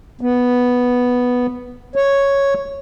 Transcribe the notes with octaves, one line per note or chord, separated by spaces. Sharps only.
B3
C#5